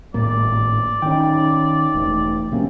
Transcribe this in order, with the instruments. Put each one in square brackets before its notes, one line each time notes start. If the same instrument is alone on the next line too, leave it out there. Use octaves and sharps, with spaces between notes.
[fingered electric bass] G#1 A2 A#3 [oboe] D5
[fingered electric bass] D#3 C#4 [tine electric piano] D#4 G5
[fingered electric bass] E1 E3 A3
[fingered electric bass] C3 [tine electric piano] F#3 A#3 C#4